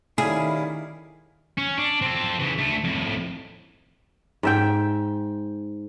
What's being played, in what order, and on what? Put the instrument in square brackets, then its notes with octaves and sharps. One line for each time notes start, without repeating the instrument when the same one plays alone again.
[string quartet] D#3 [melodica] G3 C#4 F5 [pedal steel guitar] E4 [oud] G#4
[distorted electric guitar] C#4
D4
C4 A4
C#3 E3
D2 A3
F2 A2
[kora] G#2 E5 G5